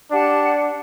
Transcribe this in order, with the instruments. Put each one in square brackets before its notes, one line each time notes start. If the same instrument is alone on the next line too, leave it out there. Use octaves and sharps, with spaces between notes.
[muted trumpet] D4 [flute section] G4 F#5 A5